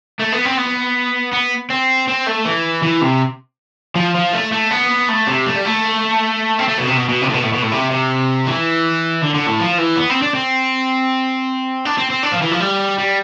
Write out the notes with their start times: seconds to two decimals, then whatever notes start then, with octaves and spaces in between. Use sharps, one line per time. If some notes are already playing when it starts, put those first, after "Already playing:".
0.19 A3
0.32 B3
0.45 C4
0.57 B3
1.33 B3
1.70 C4
2.08 C4
2.27 A3
2.45 E3
2.83 E3
3.02 C3
3.95 F3
4.15 F3
4.33 A3
4.52 A3
4.71 B3
5.09 A3
5.27 C3
5.46 A3
5.55 G3
5.65 A3
6.59 C4
6.68 A3
6.78 B2
6.87 C3
6.97 B2
7.09 B2
7.22 C3
7.29 A2
7.34 B2
7.43 A2
7.53 B2
7.62 A2
7.72 C3
7.90 C3
8.47 E3
9.22 D3
9.35 D3
9.47 A2
9.60 F3
9.78 E3
9.97 B3
10.10 C4
10.22 D4
10.35 C4
11.85 D4
11.98 C4
12.10 C4
12.23 D4
12.32 F3
12.41 E3
12.51 F3
12.60 G3
12.98 G3